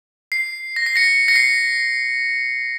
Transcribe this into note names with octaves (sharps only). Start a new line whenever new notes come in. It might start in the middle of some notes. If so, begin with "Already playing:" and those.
C7
A#6
C7
A#6 C#7
A#6 C#7
C7